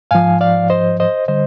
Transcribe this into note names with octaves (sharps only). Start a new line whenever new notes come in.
G#2 F3 F5 G#5
D5 F5
C5 D#5
C5 D#5
D3 G3 C5 D#5